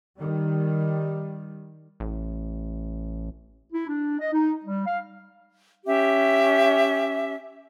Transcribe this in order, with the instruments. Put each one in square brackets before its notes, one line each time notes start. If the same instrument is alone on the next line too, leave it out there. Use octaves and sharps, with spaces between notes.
[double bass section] D#3 G3
[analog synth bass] A1
[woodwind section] E4
D4
D#5
D#4
G3
F5
[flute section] C#4 G4 E5